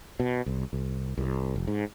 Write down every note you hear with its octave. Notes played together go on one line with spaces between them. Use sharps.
B2
C2
C2
C2
F1
G#2